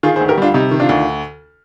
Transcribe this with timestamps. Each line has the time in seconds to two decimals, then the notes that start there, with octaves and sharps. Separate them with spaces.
0.03 D#3 F4 G#4
0.16 G#4 C5
0.21 D2
0.28 G4 A#4
0.38 G3 D4 F4
0.54 C3 D#4
0.71 D#3
0.80 D4 F4
0.89 D2